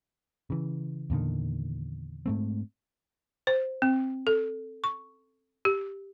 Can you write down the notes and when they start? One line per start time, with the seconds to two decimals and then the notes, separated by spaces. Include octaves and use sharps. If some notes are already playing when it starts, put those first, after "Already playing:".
0.50 C#3 E3
1.10 E2 A#2 D3 D#3
2.26 G#2 A3 C4
3.47 C5
3.82 C4
4.27 A4
4.84 C#6
5.65 G4